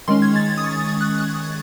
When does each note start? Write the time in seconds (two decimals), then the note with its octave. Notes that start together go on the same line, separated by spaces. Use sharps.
0.08 D#3 G#3 C#4 C6
0.22 G#6
0.36 A6
0.57 D#6
0.64 C#6
1.01 F#6
1.20 F#6